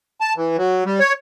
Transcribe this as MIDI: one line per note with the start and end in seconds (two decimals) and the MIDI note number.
0.21 0.33 81
0.37 0.57 52
0.58 0.84 54
0.85 1.00 55
1.00 1.13 73